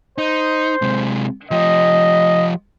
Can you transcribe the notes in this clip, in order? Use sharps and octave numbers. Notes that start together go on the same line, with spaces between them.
D#4 C5
C3 G#3
F3 G4 D#5